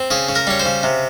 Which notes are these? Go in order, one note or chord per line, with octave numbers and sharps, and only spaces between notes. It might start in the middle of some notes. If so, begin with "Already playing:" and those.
Already playing: C4
C#3 G#4
C#3
A#4
G3 C#5
C5
C#3
C3